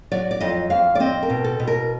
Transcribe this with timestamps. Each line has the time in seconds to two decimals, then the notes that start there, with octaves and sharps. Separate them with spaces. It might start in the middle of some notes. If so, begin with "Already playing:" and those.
0.12 F#3 D5
0.31 D5
0.41 F2 D#5
0.70 F2 F5
0.95 D5
1.00 C4 D#5
1.23 A#4
1.30 B2
1.44 A4
1.60 B2
1.67 A#4